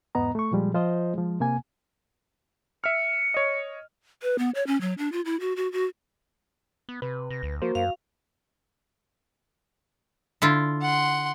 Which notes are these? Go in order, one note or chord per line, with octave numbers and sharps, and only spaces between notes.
E2 G#2 B3 D#5 A#5
A3 C#6
A#2 F3 G3 G#3
F3 F4 C5 D#5
F3 G#3
C3 A#3 G#5
E5 F6 C#7
C#5 D#5
B4
B3
C#5
C#4
F#3
D4
F4
E4
F#4
F#4
F#4
B3
C3 B4
C3 A#6
D2
F3 A#3 F#4 A#4 C5
F#2 F5
D3 E4 F4
F#5 C6